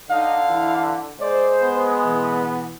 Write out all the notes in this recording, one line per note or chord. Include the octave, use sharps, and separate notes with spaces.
D3 D#4 F5
E3 E4
G#3 C5 D5
B3
B2 E3